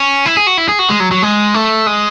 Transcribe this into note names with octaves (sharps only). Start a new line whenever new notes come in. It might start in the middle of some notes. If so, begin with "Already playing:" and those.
Already playing: C#4
E4
G#4
F#4
E4
G#4
F#4
G#3
F#3
F#3
G#3
A3
G#3